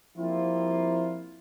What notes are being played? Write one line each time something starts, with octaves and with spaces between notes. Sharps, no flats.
F3 G3 A#3 C4 E4 F4